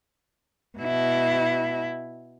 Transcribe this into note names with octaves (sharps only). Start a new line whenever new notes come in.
B2 E4